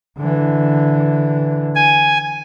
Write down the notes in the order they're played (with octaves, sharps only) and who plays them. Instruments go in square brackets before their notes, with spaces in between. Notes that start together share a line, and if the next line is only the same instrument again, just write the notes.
[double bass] D3 E3
[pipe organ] G#5